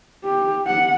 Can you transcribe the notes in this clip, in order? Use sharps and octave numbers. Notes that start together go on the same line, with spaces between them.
G4
F#5